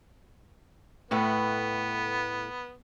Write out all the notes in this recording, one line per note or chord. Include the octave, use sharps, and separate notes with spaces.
A2 A3 B3 B4